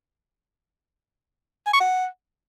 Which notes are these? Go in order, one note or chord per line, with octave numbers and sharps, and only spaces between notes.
G#5
C#6
F#5